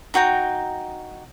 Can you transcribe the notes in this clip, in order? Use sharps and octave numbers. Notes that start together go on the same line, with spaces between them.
D#4 F#4 G5 A#5